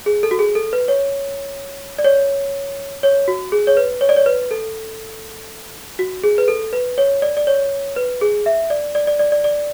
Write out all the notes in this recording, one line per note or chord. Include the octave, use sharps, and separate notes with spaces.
G#4
A4
F#4
G#4
A4
B4
C#5
D5
C#5
C#5
F#4
G#4
C#5
B4
C#5
D5
C#5
B4
A4
F#4
G#4
B4
A4
B4
C#5
D5
D5
C#5
B4
G#4
E5
D5
D5
D5
D5
D5
D5